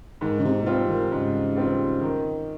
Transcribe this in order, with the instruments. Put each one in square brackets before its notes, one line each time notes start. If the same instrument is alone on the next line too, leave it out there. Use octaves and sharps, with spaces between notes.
[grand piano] G#2 [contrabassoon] D#3
[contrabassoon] C#3
C3
A#2
[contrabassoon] C3 [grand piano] G3 C4 F4
[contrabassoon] D#3
[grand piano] G#2 [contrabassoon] C#3
[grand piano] G3 C4 F4
D#3